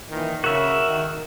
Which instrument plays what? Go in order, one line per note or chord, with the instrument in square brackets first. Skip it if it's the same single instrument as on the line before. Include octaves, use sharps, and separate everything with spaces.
[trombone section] A#2 D#3 E3
[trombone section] C#3 [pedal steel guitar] F#4 E5 [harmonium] A#4
[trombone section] D#3